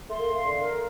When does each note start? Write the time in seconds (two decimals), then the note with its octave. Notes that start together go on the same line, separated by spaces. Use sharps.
0.09 A3 C6
0.19 A#3
0.30 A3 F5
0.44 D3
0.57 A#4